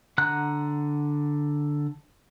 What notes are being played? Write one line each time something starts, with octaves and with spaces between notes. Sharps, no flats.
D3 F#5 A#5 F#6